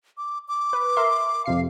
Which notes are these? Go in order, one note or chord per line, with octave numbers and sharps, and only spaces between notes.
D6
D6
B4
A#4 E5 C6
F2 C3 F5 C7